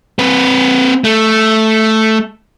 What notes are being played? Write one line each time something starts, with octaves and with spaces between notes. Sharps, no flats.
C4 B4
A3